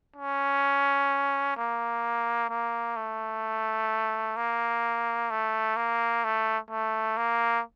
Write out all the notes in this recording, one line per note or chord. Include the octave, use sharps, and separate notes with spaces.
C#4
A#3
A#3
A3
A#3
A3
A#3
A3
A3
A#3